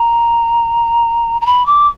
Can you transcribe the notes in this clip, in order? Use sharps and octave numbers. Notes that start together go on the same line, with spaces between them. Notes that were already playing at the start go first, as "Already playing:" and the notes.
Already playing: A#5
A#5
B5
D6